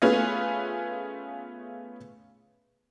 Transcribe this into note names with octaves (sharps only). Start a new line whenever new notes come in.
A3 B3 C#4 F4 G#4 B4